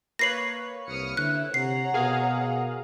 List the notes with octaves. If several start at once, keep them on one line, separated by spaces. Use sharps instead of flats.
A#3 B4 C#5 A#6 C7 F#7
C2 D#6 F6 C#7
D3 E4 F#6
C3 C#5 F#5 A#5 C7
B2 G#4 A#4 F5